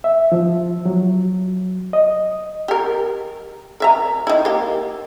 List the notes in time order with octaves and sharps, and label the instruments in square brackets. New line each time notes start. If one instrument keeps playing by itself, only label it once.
[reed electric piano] E5
F3
F#3
D#5
[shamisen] G4 A#4
A#4 E5 A#5
D#3 E4
A#3 G4